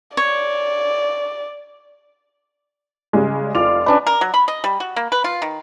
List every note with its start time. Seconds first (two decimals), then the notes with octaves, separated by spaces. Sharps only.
0.17 C#5 D5
3.13 C#3 G3 G#3
3.55 F1 F4 D5 F7
3.86 C#4 D4 B4 D5
4.07 A#4
4.21 F#3
4.34 B5
4.48 D#5
4.64 G3
4.80 F#4
4.96 A#3
5.12 B4
5.24 F4
5.42 D#3